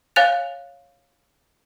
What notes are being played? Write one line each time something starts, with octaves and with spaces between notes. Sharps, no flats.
C#5 F5 G#5 F#6 A6 F7